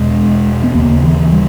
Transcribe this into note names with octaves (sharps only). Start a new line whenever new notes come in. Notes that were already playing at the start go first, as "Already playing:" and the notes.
Already playing: E2 B2 G#3
B3
D#2 C#3 A#3
E3
G3